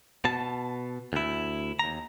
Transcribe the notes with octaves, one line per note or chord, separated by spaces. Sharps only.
B2 A5
D2 E4
D#2 A#5